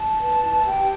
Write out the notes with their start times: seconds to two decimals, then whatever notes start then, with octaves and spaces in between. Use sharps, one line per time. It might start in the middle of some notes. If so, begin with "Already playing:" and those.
Already playing: A5
0.17 B4
0.42 E4
0.66 G4 G5